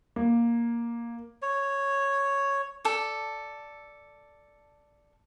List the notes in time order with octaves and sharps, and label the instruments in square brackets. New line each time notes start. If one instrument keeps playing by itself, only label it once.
[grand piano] A#3
[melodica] C#5
[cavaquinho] A4 D5